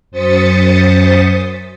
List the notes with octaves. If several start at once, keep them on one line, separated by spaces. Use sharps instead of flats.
F#2 C5 D#6 A6 B6 C#7